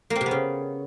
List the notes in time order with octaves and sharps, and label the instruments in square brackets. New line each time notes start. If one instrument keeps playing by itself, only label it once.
[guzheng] A#3
C4
C3
B3
C#3